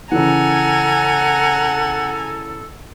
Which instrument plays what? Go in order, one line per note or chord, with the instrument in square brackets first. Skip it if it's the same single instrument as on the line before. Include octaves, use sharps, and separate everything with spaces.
[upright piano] C#3 E3 [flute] A4 [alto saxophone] F#5 [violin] G#5 A#5